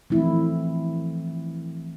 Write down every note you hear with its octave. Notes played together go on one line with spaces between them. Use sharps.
E3 F3 A3 C4 E4